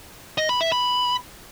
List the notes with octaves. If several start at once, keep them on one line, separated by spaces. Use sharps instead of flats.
D#5
B5
E5
B5